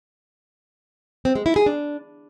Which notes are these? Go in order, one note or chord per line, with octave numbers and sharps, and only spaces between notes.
C4
G#3
E4
G#4
D4